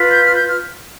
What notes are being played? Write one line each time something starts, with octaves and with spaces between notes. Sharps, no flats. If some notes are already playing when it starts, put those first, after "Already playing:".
Already playing: F4 B4
G6
F6
G6
F6